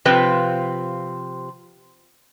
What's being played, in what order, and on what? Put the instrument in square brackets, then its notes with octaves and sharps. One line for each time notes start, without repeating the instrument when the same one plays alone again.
[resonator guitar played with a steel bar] C3 F3 C4 F4 B4 G5